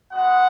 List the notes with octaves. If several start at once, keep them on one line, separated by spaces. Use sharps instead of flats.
G#3 B3 F#4 F#5